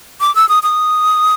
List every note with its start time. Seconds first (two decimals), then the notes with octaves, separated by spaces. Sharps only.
0.21 D6
0.35 E6
0.49 D#6
0.63 D#6